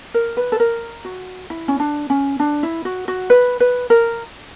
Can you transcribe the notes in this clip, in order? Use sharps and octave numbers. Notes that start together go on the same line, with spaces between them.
A#4
B4
A4
A#4
F#4
E4
C#4
D4
C#4
D4
E4
F#4
F#4
B4
B4
A#4